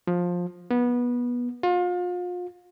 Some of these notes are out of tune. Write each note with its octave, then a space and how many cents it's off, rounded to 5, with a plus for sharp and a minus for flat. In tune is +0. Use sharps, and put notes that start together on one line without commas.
F3 +15
B3 -20
F4 +35